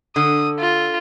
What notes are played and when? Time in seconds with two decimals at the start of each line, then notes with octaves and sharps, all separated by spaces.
0.16 D3 D#6
0.59 F4